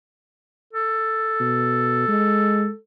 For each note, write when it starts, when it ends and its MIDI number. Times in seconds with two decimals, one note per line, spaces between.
0.73 2.77 69
1.40 2.06 47
2.08 2.69 56